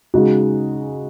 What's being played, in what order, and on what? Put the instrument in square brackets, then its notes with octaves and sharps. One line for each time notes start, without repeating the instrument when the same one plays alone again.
[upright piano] C#3 G#3 D#4 F#4